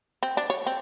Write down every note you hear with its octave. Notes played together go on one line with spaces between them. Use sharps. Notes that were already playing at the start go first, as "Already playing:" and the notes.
C4
D4
C#5
C4